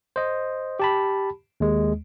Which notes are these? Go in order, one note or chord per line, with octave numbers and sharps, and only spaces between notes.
C5 D#5
G4 A5 B5
D#2 G#3